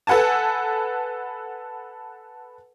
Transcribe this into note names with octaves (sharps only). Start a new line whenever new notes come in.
A4 B4 F#5 G#5 A5